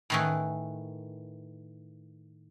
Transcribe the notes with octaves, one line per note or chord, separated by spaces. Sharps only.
A2 D#3 E3